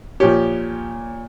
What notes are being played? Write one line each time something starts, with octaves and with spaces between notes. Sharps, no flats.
A#2 F3 G4 C#5